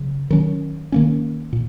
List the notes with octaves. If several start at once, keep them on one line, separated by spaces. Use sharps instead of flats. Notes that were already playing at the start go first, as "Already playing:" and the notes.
Already playing: C#3 F#3
D#3 F#3 C#4
D#3 A#3 C#4
A#2